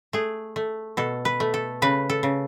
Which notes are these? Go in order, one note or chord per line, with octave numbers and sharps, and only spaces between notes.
A3 G#4
A3
B2 A4
B4
A3
A4
C#3 B4
A4
C#3